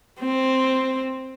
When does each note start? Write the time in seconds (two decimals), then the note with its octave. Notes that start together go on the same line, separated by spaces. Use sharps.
0.20 C4